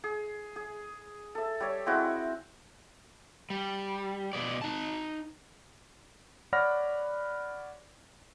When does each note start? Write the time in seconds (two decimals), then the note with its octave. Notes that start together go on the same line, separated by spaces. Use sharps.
0.04 G#4
0.56 G#4
1.35 A4 E5
1.60 G3 C#5
1.86 G#3 C4 E4 F#4
3.50 G3
4.33 B2 F3 G#4 D5
4.62 D#4 A5
6.53 C#5 D5 F#5 B5 F6 A#6